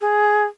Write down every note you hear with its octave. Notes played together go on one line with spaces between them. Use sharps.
G#4